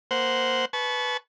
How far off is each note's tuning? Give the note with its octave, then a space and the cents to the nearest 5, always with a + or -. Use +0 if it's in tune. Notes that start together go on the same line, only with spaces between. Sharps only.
A#3 +0 C5 -10 F#5 +0
B4 +0 A5 -35 C#6 +0